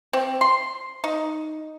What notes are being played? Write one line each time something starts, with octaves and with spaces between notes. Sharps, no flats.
C4
C6
D#4